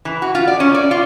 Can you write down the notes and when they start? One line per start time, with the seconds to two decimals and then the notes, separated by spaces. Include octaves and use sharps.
0.05 E3
0.22 F#4
0.35 F4
0.48 D5
0.60 C#4
0.74 D5
0.91 F4